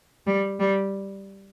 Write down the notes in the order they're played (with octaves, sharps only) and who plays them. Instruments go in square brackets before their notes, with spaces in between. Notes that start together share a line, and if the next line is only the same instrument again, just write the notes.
[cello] G3
G3